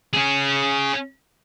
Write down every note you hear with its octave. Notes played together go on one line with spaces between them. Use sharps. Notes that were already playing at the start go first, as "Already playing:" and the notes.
C#4 G#4